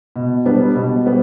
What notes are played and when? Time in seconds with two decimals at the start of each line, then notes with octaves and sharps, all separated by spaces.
0.16 B2
0.46 G3 B3 D4
0.75 B2
1.06 G3 B3